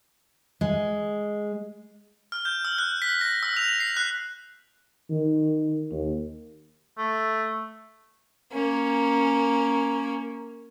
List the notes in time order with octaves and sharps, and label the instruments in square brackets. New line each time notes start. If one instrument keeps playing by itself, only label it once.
[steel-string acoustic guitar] G#3
[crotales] F6
G6
E6
F#6
B6
A#6
E6
F7
C7
F#6
[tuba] D#3
D#2
[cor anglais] A3
[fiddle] A#3 C#4